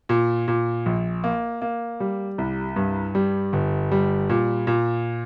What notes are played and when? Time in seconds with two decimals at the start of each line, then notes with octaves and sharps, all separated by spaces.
0.09 A#2
0.48 A#2
0.86 A#1
1.24 A#3
1.62 A#3
2.00 G3
2.38 C2
2.76 G2
3.15 G3
3.53 G1
3.92 G3
4.30 A#2
4.67 A#2